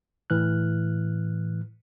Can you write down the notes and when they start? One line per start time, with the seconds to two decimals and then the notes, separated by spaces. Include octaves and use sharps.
0.30 A2 E3 F6 F#6